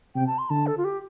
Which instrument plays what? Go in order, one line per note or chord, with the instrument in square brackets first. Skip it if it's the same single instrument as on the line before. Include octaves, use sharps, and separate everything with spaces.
[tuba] C3 [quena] G5
[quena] A5
C6
[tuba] D3 [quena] A5
[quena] A4
F4
G4